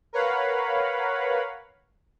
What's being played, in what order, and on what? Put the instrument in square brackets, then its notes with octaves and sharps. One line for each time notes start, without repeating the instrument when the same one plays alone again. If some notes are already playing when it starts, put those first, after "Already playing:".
[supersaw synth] A#4 B4 C#5 F5 F#5 B5